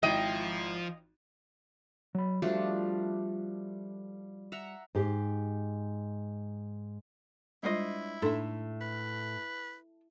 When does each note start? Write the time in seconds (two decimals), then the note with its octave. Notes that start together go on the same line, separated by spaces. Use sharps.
0.03 G#1 F3 E4 F4 D#5 G5 D#7
2.15 F#3 B5
2.42 F3 G3 A3 D4 F4 F#4
4.52 E5 F#5 A#5
4.95 G#2 G4
7.63 G3 G#3 D4 E4 F4 C5 D#5
8.22 A2 D4 D#4 A4 E5 C6
8.81 B4